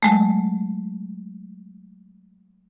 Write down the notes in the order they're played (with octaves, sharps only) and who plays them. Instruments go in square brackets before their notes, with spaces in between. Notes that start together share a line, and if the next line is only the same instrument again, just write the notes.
[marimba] F#3 G#3 A3